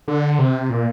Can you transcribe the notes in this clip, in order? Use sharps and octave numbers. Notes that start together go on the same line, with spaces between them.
D3
C3
A#2